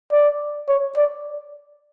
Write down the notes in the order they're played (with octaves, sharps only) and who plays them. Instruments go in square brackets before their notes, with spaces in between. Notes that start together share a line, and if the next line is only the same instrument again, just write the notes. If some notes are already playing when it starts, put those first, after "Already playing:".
[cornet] D5
C#5
D5